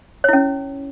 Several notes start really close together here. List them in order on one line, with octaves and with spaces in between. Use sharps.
C#5 E4 C#4